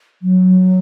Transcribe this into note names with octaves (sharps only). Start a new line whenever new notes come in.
F#3